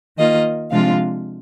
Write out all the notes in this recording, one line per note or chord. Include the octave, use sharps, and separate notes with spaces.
D#3 A#3 F4 D#5
C3 F3 G#3 D4 F4 F5